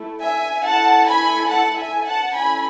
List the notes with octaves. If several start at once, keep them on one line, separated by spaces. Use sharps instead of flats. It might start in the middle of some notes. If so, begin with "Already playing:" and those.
Already playing: A3 E4 A4
E5 G#5
A3 E4 A4 F#5 A5
G#5 B5
F#5 A5
E5 G#5
F#5 A5
C#4 E4 A4 G#5 B5